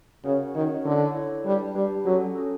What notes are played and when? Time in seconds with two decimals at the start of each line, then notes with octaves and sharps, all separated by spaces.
0.25 C#3 C#4 F#4 A#4 C#5 F#5
0.55 D#3 C#4 F#4 A#4 C#5 F#5
0.85 D3 E4 A4 C#5
1.15 E4 A4 C#5
1.45 G3 D4 G4 B4
1.75 G3 D4 G4 B4
2.05 F#3 C#4 F#4 A4
2.35 C#4 F#4 A4